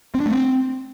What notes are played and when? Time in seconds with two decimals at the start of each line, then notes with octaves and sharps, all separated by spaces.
0.15 C4
0.20 D4
0.26 A3
0.31 C4